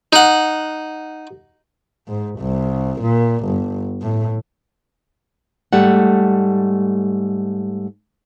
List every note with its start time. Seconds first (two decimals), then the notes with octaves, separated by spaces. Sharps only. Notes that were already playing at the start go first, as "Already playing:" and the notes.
0.13 D#4 F#5
2.08 G#2
2.40 C2
3.02 A#2
3.45 G1
4.02 A2
5.73 G#2 G3 A3 F#5